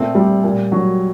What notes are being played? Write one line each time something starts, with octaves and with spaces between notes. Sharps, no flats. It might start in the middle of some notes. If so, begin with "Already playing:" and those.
Already playing: A#2 A3 C4
G3
A#2
F#3